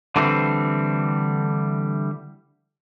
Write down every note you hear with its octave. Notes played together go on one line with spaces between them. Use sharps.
D3 E3 G3 A3 C4